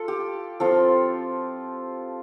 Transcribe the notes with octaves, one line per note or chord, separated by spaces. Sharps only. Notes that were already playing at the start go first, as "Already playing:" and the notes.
Already playing: F4 A4
G4
F3 C4 F4 A4